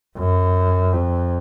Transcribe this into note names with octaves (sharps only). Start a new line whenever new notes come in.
F#2
F2